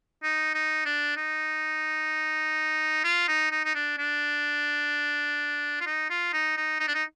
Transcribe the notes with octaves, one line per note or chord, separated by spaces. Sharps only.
D#4
D#4
D4
D#4
F4
D#4
D#4
D#4
D4
D4
F4
D#4
F4
D#4
D#4
D#4
D4
D#4